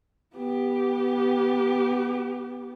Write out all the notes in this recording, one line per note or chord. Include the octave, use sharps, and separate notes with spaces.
B3 G4